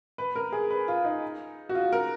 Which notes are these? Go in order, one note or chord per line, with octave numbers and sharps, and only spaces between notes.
B4
A#4
G#4
B4
F4
D#4
F#4
F4
A#4